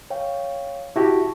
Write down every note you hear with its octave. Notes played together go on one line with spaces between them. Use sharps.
C#5 F5 G5
E4 F#4 G4 A5 C#6 A#6